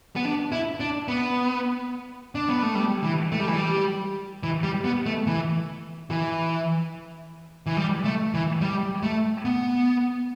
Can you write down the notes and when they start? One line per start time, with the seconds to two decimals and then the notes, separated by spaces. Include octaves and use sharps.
0.16 B3
0.25 D4
0.52 E4
0.80 D4
1.08 B3
2.35 D4
2.49 B3
2.63 A3
2.75 G3
3.04 E3
3.32 A3
3.40 G3
3.48 E3
3.57 G3
4.43 E3
4.63 G3
4.84 B3
5.06 A3
5.27 E3
6.10 E3
7.66 E3
7.77 G3
8.05 A3
8.34 E3
8.61 G3
9.03 A3
9.45 B3